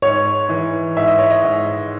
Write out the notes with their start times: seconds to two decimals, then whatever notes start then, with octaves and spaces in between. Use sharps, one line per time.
0.02 G#2 C#5
0.49 E3
0.96 G#2 E5
1.07 D#5
1.19 C#5
1.30 D#5
1.43 G#2